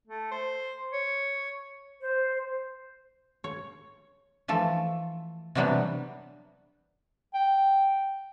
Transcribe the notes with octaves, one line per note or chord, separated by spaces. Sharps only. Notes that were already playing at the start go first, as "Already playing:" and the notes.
A3
C5
C#5
C5
C#5
E3 F3 A3 A4
C3 E3 F#3 G3 B3 D4
G5